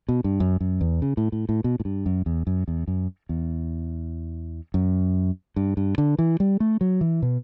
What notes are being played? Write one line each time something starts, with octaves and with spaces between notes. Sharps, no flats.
B2
G2
F#2
F#2
E2
C#3
A2
A2
A2
B2
A2
G2
F#2
E2
F#2
E2
F#2
E2
F#2
G2
G2
D3
E3
G3
A3
F#3
E3
B2